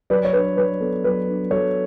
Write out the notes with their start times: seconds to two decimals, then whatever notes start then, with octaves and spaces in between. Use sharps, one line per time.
0.10 F#3 B4 D5
0.25 C#5
0.33 D4 B4
0.57 F#3 B4
0.81 B3 A4
1.04 F#3 B4
1.28 D4
1.51 F#3 A4 C#5